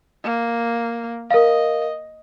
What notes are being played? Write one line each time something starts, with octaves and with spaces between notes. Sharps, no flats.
A#3
A#4 D#5 F5